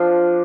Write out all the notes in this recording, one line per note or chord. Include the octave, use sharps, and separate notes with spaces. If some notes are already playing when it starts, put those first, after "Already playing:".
Already playing: F3 D4 F5